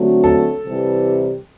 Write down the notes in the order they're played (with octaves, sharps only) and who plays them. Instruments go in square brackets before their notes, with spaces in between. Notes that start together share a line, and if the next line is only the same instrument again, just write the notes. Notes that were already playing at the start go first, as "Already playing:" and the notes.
Already playing: [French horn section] D3 F#3 A3 C4 F#4
[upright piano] A4
[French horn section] C3 E3 G3